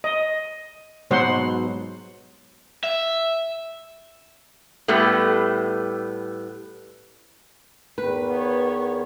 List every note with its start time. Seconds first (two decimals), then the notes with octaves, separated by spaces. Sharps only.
0.04 D#5
1.11 G#2 B2 F#3 C5 F#5 C6
2.84 E5
4.88 A2 G3 A3 B3 G4 A4
7.98 E2 D#3 B4
8.28 B3 C#5